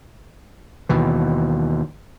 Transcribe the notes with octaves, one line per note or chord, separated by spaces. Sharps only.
D#2 B2 E3